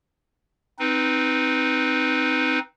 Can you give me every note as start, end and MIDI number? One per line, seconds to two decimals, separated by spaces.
0.79 2.59 60
0.79 2.59 63
0.79 2.59 71